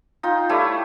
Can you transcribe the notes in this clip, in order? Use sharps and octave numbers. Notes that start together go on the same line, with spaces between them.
D#4 F4 G5
G3 A3 E4 C#5